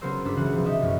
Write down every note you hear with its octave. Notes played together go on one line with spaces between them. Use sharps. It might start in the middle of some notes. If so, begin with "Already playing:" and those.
C#3 F#3 B3 A#4 C5 E6
G1 G#2 B3 D4 B5 E6
C#2 C#3 E3 F#4 F#5 E6
C3 F3 B3
D#4 B4 D#5 E5
B1 F#2 C#4